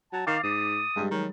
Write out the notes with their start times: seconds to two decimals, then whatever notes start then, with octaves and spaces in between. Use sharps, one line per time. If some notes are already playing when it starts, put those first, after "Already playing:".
0.13 F#3 A5
0.27 D#3 F5 D6 A6 C7
0.43 G#2 D#6
0.96 G2 G3 G#3
1.11 D#3 F#3